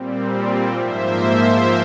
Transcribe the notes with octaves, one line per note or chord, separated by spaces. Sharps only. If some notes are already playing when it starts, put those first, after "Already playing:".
Already playing: A#2 G3 C4
G#2 F3 A#3 C5 E5